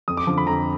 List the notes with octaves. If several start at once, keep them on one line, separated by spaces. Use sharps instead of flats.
F2 D#6
D6
D3 F3
B5
F2 A#5